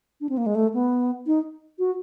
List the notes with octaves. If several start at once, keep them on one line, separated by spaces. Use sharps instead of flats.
D4
C4
A#3
G#3
A3
B3
D#4
F#4